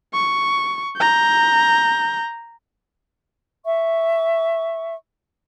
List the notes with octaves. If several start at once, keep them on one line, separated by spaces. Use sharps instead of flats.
C#6
A#5 G6
E5 C#6